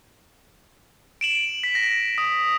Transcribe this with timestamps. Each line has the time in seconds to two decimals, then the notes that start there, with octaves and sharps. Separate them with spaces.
1.21 D7 E7 F#7
1.64 B6
1.75 A#6
2.18 D#6